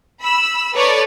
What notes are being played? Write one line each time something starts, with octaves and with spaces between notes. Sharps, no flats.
B5 E6
A4 B4 C#5 D5 A#5